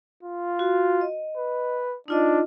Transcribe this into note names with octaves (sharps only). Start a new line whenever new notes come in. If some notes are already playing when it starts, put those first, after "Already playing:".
F4
F#4
D#5
B4
D4 D#4 F4 D#5